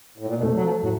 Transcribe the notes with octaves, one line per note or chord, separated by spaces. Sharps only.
A2
A#2
B2
C3 A3
F#3
F3
A2 F#3